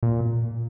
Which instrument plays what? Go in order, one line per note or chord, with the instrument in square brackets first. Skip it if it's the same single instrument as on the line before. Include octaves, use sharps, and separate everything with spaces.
[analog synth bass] A#2